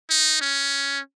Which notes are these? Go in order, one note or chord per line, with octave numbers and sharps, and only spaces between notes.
D#4
C#4